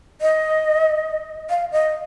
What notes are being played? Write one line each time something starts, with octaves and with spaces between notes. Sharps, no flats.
D#5
F5
D#5